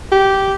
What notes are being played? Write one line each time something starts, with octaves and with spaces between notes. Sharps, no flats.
G4